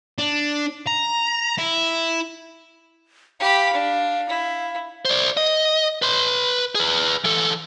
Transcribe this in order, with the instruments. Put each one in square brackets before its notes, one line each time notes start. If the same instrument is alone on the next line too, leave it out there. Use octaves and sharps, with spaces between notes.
[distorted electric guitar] D4
A#5
E4
[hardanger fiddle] G4 B5 [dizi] F5
[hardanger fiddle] D4
E4
[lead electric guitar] C5 D5
D#5
B4 C6
G#4 B4
E3 A4